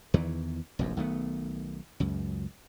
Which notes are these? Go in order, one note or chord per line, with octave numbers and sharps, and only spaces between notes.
E2 D#3 E3
F1 A#1 F#2
B1 D#3 A3 B3
C#2 F#2